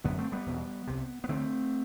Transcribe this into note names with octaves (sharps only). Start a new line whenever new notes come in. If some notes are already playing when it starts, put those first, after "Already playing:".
F#2 D3 B3 D4
A3 C4
G3 B3
E2 B2
C2 C3
B3
D2 D3 A3 C4